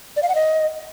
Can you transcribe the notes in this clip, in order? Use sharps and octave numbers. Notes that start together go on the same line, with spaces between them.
D5
F5
F#5
D#5